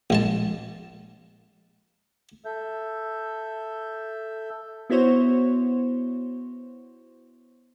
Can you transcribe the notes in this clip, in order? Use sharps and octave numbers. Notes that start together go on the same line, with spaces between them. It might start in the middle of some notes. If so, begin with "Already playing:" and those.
A#1 G#3 A5
A4 E5 G6
B3 E4 F#4 C5 C#5